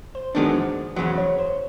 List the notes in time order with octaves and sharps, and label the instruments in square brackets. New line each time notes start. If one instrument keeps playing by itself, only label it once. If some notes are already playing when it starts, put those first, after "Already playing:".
[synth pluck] C5
[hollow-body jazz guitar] F#2 D#3 G#3 B3 D4
[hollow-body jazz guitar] E2 C#3 F#3 [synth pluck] C5
[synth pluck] C#5
C5